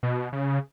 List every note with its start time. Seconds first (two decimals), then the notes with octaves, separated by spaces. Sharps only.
0.03 B2
0.33 C#3